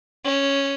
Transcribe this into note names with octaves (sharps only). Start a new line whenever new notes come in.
C#4